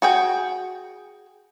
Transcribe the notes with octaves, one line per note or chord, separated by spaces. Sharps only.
F#4 G#4 G5